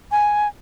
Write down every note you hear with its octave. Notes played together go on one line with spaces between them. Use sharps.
G#5